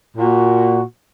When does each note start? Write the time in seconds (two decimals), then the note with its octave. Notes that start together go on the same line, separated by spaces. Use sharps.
0.17 A#2 A#3 F#4